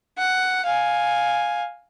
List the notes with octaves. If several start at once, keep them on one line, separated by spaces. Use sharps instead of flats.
F#5
F5 G#5